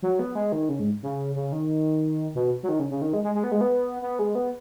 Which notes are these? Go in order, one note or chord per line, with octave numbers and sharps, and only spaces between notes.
F#3
B3
G#3
D#3
C#3
G#2
C#3
C#3
D#3
B2
F#3
D#3
C#3
C#3
D#3
G#3
G#3
G#3
B3
G#3
B3
B3
G#3
B3